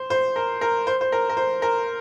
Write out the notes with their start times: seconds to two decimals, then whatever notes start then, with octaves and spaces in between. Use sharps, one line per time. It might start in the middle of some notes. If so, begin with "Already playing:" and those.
Already playing: C5
0.10 C5
0.36 A#4
0.61 A#4
0.87 C5
1.01 C5
1.12 A#4
1.29 A#4
1.37 C5
1.62 A#4